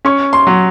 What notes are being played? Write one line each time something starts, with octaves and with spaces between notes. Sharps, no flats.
C#4 C#6
C6
F#3